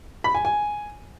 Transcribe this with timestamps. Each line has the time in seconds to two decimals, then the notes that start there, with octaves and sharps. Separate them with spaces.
0.24 B5
0.35 G#5
0.45 G#5